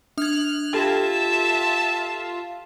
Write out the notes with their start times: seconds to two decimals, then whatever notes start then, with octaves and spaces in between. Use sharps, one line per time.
0.18 D4 F6 F#6 G#6
0.73 F4 G4 A4 E5 G5 A5